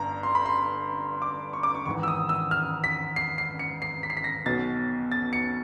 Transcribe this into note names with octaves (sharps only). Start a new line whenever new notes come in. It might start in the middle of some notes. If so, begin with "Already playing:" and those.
Already playing: G1 G2 D3 A#5
C6
B5
C6
D6
C#6
D6
C#6
G#1 G#2 E3 C#6
E6
D#6
E6
F6
B6
C7
C7
C#7
C7
B6
C7
B6
A#6
B1 B2 F#3 A6
A6
C#7